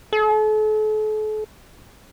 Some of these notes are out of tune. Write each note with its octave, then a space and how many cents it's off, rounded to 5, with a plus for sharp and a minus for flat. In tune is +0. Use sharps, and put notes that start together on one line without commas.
A4 -40